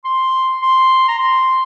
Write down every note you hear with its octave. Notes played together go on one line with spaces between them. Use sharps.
C6
C6
A#5
C6